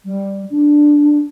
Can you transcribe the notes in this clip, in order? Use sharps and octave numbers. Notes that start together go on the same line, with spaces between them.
G3
D4